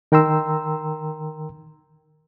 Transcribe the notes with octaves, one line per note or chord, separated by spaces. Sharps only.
D#3 A#4 G5 A#5 C6 E6